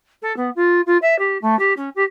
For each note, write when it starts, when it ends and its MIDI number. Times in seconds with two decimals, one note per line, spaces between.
0.22 0.35 69
0.37 0.50 59
0.56 0.81 65
0.86 0.97 65
1.02 1.17 76
1.19 1.38 67
1.42 1.58 57
1.59 1.73 67
1.77 1.89 61
1.96 2.04 67